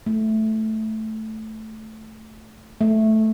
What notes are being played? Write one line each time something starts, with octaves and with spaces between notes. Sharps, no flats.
A3
A3